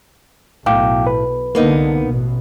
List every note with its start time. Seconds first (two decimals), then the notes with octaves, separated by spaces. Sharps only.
0.66 B1 A2 F5 G5 D6
1.07 B4
1.55 C2 D3 A#3 B3 D#4
2.06 A1 B2